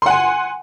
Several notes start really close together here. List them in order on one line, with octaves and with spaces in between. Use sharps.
C6 F#5 G#5